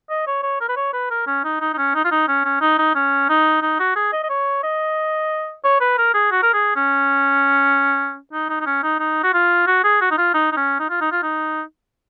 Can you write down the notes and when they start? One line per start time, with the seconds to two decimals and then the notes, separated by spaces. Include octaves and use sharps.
0.10 D#5
0.27 C#5
0.43 C#5
0.61 A#4
0.69 B4
0.77 C#5
0.93 B4
1.11 A#4
1.27 C#4
1.44 D#4
1.61 D#4
1.74 D#4
1.78 C#4
1.95 D#4
2.05 F4
2.11 D#4
2.28 C#4
2.45 C#4
2.61 D#4
2.79 D#4
2.95 C#4
3.29 D#4
3.62 D#4
3.80 F#4
3.96 G#4
4.13 D#5
4.24 D#5
4.30 C#5
4.63 D#5
5.64 C#5
5.81 B4
5.98 A#4
6.14 G#4
6.31 F#4
6.43 A#4
6.54 G#4
6.76 C#4
8.33 D#4
8.50 D#4
8.60 D#4
8.66 C#4
8.83 D#4
9.00 D#4
9.24 F#4
9.34 F4
9.67 F#4
9.84 G#4
10.01 F#4
10.11 D#4
10.18 F4
10.34 D#4
10.52 D#4
10.57 C#4
10.80 D#4
10.90 F4
11.01 D#4
11.12 F4
11.23 D#4